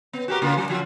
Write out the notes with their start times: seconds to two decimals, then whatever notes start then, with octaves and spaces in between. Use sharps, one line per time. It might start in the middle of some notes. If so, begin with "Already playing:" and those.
0.13 B3
0.28 F#4 G4 A#4
0.42 C#3 A#3 F4
0.57 F#3
0.69 F3 F4 F#4